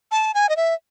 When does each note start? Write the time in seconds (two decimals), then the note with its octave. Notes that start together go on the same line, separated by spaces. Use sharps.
0.11 A5
0.34 G#5
0.49 D#5
0.56 E5